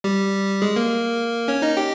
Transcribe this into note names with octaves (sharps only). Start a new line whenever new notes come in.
G3 G4
G#3 G#4
A#3 A#4
C#4 C#5
D#4 D#5
G4 G5